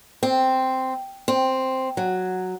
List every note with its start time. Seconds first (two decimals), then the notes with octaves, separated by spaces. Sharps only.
0.23 C4
1.28 C4
1.97 F#3